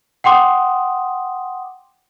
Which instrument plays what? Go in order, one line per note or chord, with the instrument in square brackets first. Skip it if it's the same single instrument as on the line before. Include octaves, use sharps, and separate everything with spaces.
[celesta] F#5 G5 C6 D6 D#6